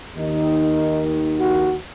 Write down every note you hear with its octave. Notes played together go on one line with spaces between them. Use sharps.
D#2 D#3 D#4
F#4